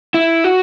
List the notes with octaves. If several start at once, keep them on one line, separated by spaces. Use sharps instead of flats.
E4
F#4